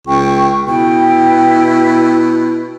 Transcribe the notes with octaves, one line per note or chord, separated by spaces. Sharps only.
C#2 G5 C#6
B2 E4 G5